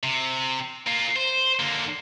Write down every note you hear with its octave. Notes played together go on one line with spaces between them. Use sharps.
C3
A#3 F4
C5
D3 A#3